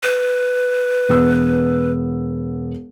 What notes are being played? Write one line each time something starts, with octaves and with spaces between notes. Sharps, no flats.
B4
E1 B3 E6